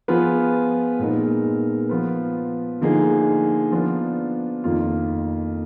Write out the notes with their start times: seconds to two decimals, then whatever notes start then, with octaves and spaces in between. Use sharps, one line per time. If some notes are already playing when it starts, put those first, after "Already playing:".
0.08 F3 B3 F4 G#4 B4
0.99 A#2 G#3 B3 D#4 A#4
1.89 F3 B3 F4 B4
2.81 D3 F3 A#3 D#4 G#4
3.72 F3 B3 D4 F4
4.64 F2 D#3 A#3 F4